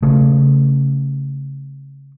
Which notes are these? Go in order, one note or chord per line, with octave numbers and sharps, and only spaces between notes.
C#3 A3